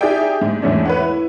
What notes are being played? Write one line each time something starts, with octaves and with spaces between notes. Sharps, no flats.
D#4 G4 G#4 D5 E5 G5
G#2
E2 G#2 A3 C#4 D4
B4 C#5 F#5
E4